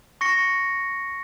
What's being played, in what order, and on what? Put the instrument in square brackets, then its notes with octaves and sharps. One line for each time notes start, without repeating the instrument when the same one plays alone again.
[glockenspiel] C#6 A#6 C#7